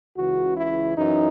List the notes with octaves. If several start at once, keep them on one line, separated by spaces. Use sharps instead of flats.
C#2 C#3 E3 F#4
E4
F#2 E3 D#4